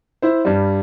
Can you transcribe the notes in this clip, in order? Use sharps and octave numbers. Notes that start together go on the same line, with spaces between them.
E4 C5
G2 G3